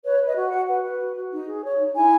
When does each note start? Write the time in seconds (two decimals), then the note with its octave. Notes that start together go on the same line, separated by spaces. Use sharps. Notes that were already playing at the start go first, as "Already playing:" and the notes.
0.05 B4 C#5
0.20 B4
0.26 D#5
0.36 F#4
0.48 F#5
0.53 F#4
0.68 B4
0.84 B4
1.00 F#4
1.16 F#4
1.32 D#4
1.48 G#4
1.64 C#5
1.80 D#4
1.95 E4 G#5